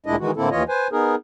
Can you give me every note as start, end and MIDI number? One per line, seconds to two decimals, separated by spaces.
0.06 0.16 38
0.06 0.16 46
0.06 0.16 56
0.06 0.16 62
0.06 0.16 64
0.06 0.16 75
0.19 0.31 51
0.19 0.31 52
0.19 0.31 56
0.19 0.31 66
0.36 0.49 45
0.36 0.49 50
0.36 0.49 58
0.36 0.49 60
0.36 0.49 64
0.36 0.49 69
0.51 0.63 39
0.51 0.63 52
0.51 0.63 65
0.51 0.63 73
0.51 0.63 75
0.69 0.88 71
0.69 0.88 72
0.69 0.88 80
0.92 1.15 59
0.92 1.15 63
0.92 1.15 68
0.92 1.15 70